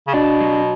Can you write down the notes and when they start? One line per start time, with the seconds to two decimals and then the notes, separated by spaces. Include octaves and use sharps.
0.07 C#3
0.14 B2 D4
0.40 F#3